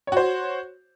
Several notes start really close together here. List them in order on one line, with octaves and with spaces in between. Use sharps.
C#5 F#4 C5